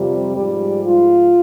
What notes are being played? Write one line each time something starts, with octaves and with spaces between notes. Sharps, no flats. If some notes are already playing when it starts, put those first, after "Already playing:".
Already playing: F2 C3 F3 G3
G#2 F3 G3
F4